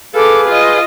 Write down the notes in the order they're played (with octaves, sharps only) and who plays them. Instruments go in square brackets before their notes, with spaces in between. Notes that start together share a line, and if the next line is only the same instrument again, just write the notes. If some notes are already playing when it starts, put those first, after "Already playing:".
[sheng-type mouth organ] G#4 B4 F5 [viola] A4 D6
[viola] F4 D#5